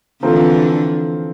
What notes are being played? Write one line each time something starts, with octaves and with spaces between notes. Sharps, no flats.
D3 E3 F3 A3 C4 F4 A#4